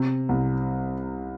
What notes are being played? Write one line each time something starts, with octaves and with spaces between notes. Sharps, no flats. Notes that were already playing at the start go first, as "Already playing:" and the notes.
Already playing: C3
C2